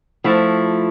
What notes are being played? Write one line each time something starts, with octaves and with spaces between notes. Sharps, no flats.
F3 A3 E4